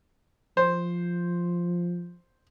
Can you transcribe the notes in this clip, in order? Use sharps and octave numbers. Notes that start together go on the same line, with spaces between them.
F3 C5